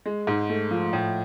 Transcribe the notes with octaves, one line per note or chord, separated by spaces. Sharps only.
G#3
G#2
A3
F3
A2